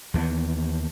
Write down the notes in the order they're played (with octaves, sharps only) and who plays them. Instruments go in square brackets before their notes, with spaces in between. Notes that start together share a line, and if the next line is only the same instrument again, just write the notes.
[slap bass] D#2 E3 A#3 B3